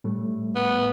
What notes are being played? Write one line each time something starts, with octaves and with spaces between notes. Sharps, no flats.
A2 G3 A3
B3